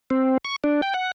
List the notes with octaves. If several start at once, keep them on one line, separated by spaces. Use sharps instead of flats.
C4
C#6
D4
G5
F#5